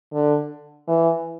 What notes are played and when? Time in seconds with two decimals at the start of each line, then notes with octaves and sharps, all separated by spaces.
0.13 D3
0.88 E3